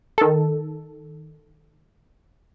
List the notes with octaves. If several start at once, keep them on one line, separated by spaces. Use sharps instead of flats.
D#3 A4